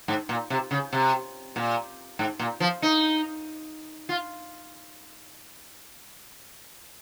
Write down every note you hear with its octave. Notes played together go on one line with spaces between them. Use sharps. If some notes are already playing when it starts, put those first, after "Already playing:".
G#2
A#2
C3
C#3
C3
A#2
G#2
A#2
F3
D#4
F4